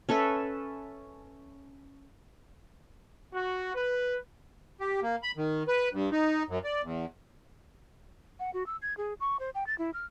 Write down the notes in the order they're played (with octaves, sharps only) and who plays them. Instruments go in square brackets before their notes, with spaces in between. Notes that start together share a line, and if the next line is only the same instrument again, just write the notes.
[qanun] C#4 A4 B4 E5
[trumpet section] F#4
B4
[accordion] G4
A#3
B5
D#3
B4
G2
D#4
F#2
D5
E2
[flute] F#5
F#4
E6
G#6
G#4
C#6
C5
G5
A6
E4
F6